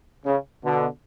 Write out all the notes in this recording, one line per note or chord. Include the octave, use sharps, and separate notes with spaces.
C#3
B2 D3